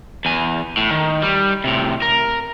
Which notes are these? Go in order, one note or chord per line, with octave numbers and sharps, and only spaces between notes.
E2 G#5
A2
D#3
G3
A2 C3
A#4